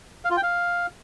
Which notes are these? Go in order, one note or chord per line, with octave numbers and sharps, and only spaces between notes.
F5
F4
G5
F5